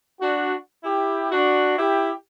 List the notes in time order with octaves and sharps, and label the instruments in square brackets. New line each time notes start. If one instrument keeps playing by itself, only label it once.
[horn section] D4 F#4
E4 G4
D4 F#4
E4 G4